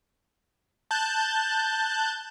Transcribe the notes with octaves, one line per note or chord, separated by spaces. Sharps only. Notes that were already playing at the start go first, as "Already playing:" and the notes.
A5 F#6 G6